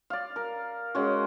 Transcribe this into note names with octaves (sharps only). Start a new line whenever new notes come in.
D5 F5
A#4
G#3 C#4 F#4